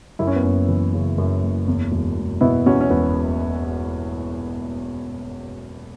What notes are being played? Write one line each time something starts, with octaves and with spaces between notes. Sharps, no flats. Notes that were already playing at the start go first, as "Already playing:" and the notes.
F#2 E4
C#4
B3
F#1 C#4
E3
C#3
F#2
F#1
E2
E1
E1
B2 B3 E4
E2 C#4 F#4
C#4
E1 B3